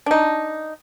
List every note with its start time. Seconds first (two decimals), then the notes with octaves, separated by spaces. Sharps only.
0.06 D4 D#4